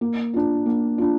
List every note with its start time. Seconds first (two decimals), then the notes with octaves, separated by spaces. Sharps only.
0.01 A#3
0.34 D4 F4
0.66 A#3
0.98 D4 F4